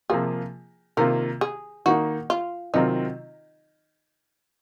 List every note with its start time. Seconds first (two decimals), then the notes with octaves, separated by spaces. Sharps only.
0.10 C3 F3 A#3 F4 G#4
0.97 C3 D#3 A#3 F4 A#4
1.41 G#4
1.86 D#3 A#3 D#4 F#4
2.30 F4
2.74 C3 D#3 F#3 C4 D#4 F4